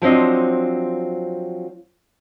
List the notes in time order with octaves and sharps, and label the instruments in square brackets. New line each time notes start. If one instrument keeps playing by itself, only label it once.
[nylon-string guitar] F3 F#3 C4 D4 C5 D#5